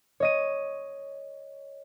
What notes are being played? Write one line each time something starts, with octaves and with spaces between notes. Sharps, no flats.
C#5 D#5 D#7